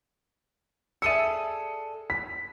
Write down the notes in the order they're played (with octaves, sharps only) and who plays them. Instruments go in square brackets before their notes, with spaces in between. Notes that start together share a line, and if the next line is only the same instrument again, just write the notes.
[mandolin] G#4 A4 D5 [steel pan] E5 E6 [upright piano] C#7 D#7
[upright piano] B6